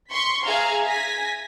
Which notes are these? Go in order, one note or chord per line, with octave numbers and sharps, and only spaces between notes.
C6 C#6 B6
G#4 E5 F5 A#5 F6
G#5 A#6 B6